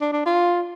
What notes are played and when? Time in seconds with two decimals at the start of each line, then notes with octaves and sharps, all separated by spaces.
0.01 D4
0.12 D4
0.26 F4